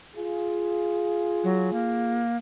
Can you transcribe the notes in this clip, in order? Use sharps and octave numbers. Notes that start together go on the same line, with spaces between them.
F4 G#4
F#3
A#3